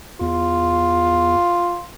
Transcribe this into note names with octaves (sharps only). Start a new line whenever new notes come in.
E2 F4